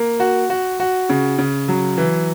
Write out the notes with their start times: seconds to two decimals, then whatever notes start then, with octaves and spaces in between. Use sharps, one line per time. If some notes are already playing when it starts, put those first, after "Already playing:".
Already playing: A#3
0.20 F#4
0.50 F#4
0.80 F#4
1.10 C#3
1.39 C#3
1.68 F#3
1.98 E3